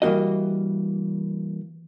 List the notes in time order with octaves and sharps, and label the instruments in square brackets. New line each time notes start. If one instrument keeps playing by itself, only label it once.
[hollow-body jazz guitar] E3 G3 A#3 F#4 D#5